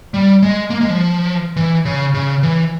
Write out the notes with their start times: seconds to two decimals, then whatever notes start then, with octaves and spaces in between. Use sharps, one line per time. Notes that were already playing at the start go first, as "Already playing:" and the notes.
0.14 G3
0.42 G#3
0.70 A#3
0.81 G#3
0.90 F3
1.56 E3
1.85 C#3
2.14 C#3
2.43 E3